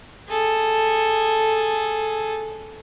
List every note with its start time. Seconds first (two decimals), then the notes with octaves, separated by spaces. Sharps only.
0.29 G#4 A4